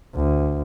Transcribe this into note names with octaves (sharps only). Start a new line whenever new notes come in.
D2